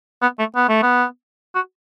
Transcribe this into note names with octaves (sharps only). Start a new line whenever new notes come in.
B3
A3
B3
A3
B3
F#4